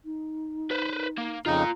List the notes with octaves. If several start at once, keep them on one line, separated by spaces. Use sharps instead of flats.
D#4
B4 C5
A#3
F2 C#3 D#4 F4 A#5